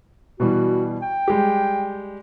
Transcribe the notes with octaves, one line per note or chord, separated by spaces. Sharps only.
B2 E3 G3 F#4
G5
G3 G#3 G4